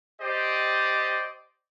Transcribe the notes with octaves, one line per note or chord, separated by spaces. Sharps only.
G4 C5 D5 D#5